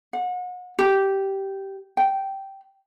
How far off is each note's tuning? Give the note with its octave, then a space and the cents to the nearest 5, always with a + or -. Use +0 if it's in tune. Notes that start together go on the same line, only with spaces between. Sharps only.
F#5 -35
G4 -10
G5 -10